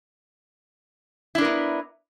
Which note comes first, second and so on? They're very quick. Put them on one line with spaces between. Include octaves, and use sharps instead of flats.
E4 D4 A#4 B3